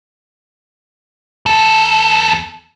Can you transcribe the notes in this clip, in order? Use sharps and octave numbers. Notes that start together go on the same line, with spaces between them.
E2 A4